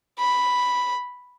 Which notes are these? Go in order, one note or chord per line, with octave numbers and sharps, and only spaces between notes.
B5